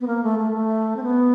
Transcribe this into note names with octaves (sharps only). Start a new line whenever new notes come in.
B3
A#3
A3
A3
A3
C4
B3